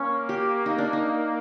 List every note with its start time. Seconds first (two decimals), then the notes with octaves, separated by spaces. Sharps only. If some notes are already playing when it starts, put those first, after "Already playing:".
Already playing: A#3 C#4
0.29 G4
0.66 D#4
0.78 D4
0.93 D#4